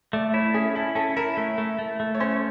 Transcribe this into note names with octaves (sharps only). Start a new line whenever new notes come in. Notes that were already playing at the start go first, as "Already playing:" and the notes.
A3 D5
E4 C#5
C#4 G#4
E4 A4
C#4 A4
E4 A#4
A3
A3
A3
A3
C#5
C#4 C5
C#5